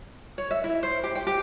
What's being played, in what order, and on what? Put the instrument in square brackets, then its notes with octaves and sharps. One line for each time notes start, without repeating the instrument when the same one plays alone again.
[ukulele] C#5
E5
E4
C5
G4
G5
G4